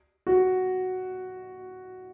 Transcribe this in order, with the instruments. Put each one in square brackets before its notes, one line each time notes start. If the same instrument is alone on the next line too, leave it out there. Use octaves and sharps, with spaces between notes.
[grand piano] F#4